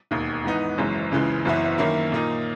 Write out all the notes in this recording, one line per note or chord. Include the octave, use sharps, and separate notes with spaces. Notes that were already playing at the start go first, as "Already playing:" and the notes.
E1 D#2 D#3
G#2 E3 B3 D#4
F#1 F#2 E3 G#3
C#2 C#3 E3 G#3
F#1 F#2 E3 B3 E4
F#2 D#3 A#3 C#4 E4
A#2 A#3 D#4